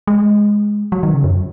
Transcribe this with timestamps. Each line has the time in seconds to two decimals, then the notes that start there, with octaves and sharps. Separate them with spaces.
0.07 G#3
0.92 F#3
1.03 D#3
1.14 C#3
1.24 F#2